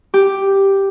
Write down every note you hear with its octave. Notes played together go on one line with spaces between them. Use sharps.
G4